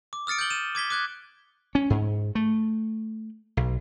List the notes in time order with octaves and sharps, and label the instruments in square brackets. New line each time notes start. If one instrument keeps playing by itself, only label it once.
[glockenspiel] D6
D#6 F6 A6 C#7 D7
G6 D7 F#7 G7
D#7 E7
D6 G#6 B6 G7
D6 F#6 G#6
[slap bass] C#4
G#2
A3
B1